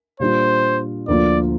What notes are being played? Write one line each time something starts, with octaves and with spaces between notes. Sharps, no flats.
A#2 G3 D4 F4 C5
D2 D3 F3 A#3 F4 D5